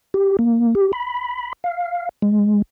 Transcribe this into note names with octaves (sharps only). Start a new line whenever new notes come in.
G4
A#3
G4
B5
F5
G#3